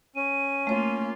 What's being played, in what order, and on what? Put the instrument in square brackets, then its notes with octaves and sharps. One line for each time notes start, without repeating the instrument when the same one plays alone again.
[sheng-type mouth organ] C#4 [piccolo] D#7
[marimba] A3 C#5 [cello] A#3 F4